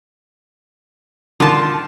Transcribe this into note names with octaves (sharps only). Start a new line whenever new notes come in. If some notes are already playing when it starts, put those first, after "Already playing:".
D3 D#3 F4 A5